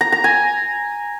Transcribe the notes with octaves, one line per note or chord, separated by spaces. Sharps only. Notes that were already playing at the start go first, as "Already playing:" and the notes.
A#5
A#5
G#5